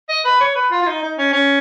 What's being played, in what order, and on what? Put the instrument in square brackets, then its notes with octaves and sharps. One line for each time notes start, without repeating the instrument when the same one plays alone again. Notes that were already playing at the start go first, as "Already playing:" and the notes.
[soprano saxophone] D#5
B4
C#5
B4
F4
F4
D#4
D#4
C#4
C#4